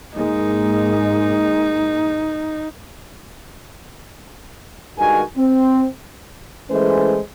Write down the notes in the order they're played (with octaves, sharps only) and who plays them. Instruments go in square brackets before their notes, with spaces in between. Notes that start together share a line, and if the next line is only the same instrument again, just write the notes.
[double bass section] G#2 G#3 A#3 [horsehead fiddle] D#4
[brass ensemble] G2 D#3 G#3 F#4 A#4 G#5
C4
[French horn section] E3 G#3 A3 C#4 C5